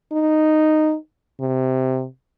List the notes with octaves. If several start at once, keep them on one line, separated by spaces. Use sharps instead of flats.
D#4
C3